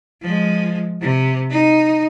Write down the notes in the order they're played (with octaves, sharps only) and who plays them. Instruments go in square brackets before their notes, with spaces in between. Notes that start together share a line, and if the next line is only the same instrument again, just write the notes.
[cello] F3 G#3
C3
D#4